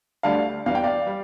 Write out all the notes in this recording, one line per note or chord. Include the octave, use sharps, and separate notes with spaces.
D2 D3 G3 F5 A5
E2 E3 G3 F5
G5
D5 F5
G3